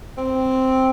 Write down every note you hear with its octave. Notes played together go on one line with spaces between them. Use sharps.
C4